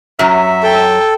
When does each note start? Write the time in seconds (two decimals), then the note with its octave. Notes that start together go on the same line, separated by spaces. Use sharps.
0.19 F#2 F#3 E5
0.63 A4 G5 A5